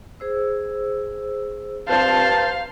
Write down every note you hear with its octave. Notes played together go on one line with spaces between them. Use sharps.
G#4 C5 E6
G2 C4 F4 C5 F5 A5
A#5